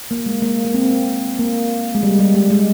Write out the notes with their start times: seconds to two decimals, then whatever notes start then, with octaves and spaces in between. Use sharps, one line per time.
0.11 A#3
0.26 G#3
0.42 A#3
0.65 A#3
0.74 C4
1.39 A#3
1.95 G#3
2.03 G3
2.19 G3
2.35 G#3
2.50 G#3